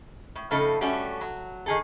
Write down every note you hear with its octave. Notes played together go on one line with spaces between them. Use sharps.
A2
A2 C#3 F3 A3 D#4 A4
G3 A3 C#4 F#4 G4
F#3
D#3 G#4 A4